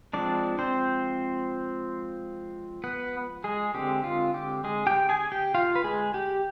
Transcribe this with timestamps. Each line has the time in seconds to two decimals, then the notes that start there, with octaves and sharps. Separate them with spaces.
0.13 F3 G#3 C4 D4 D5
0.59 C4 C5
2.84 B3 B4
3.44 G#3 G#4
3.74 D3 G#3 C4 G4
4.04 F4
4.34 G4
4.64 G#3 G#4
4.87 G4 G5
5.09 G#4 G#5
5.32 G4 G5
5.54 F4 F5
5.75 B4
5.84 G#3 G#4
6.14 G4